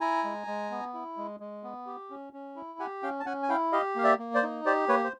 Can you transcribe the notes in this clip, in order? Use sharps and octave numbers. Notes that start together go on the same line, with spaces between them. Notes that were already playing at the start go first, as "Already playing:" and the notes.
E4 G#5 A#5
G#3
G#3
B3
E4
G#3
G#3
B3
G4
C#4
C#4
E4
G4 F#5 G#5
C#4 F5 G5
A5
C#4 F#5 G#5
G#5
E4 F5 G5
G4 D#5 F5
A#3 F5
D5 E5
A#3
C5 D5
D#4
G4 C5 D5
A#3 B4 C#5
C5